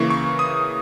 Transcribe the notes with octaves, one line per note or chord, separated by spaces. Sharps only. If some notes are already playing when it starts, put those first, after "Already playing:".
Already playing: C#3 E3 A#3 E4 C#6
C#6
D#6